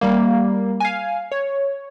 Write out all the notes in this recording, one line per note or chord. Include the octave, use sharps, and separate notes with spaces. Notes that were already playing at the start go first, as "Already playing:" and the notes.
G3 A#3
F5 G#5
C#5